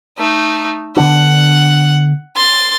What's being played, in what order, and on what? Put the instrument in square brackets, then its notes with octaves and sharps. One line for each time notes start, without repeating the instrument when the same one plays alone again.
[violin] A3 D#4
[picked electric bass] D3 B3 D4 [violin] F#5
[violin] C6 A6